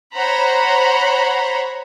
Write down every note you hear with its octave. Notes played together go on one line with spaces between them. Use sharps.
C5 C#5 F#5 A#5 B5